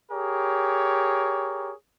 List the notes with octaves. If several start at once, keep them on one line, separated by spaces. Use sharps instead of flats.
G4 G#4 A#4 C#5